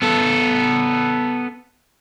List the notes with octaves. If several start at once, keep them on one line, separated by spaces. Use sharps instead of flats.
B3 A4